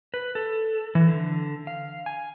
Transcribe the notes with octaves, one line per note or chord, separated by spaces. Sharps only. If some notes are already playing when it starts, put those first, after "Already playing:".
B4
A4
E3
D3
F5
G#5